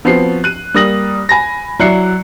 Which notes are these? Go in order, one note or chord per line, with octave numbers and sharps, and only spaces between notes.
F3 B3 C4 F#4 C7
F#6 D#7
G3 A#3 D#6 A#6 F#7
G#5 B5 A#6
F#3 E4 D5 F#6 C7 C#7